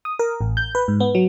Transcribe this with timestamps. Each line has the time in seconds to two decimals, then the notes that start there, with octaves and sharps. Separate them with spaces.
0.05 D#6
0.19 A#4
0.41 A1
0.57 G6
0.75 B4
0.88 G#2
1.00 B3
1.15 F#3